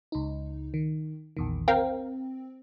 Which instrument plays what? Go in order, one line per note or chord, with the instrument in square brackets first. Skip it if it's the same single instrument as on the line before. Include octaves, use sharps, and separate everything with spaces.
[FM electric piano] C#2 D#4
D#3
A#1 E2 D#3
[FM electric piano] C4 [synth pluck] A#4 F5 G5